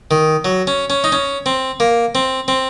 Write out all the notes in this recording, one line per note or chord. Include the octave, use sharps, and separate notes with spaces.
D#3
F#3
C#4
C#4
D#4
C#4
C4
A#3
C4
C4